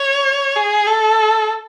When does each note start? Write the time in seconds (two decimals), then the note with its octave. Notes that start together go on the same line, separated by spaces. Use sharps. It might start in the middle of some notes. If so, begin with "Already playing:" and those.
Already playing: C#5
0.56 G#4
0.86 A4